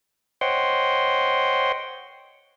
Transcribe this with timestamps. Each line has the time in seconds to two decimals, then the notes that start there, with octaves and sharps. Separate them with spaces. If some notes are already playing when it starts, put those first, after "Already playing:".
0.41 C5 C#5 D#5 F#5 G5 C6